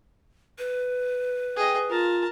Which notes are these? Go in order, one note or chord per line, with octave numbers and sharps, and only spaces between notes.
B4
G#4 D#5 G5
F4 A#4 A5